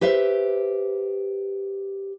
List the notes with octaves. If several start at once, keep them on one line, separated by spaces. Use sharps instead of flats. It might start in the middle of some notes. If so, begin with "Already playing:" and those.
G4 B4 C5 E5